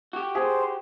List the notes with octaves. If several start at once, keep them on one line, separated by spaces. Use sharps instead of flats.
F#4 G4
G#4 C5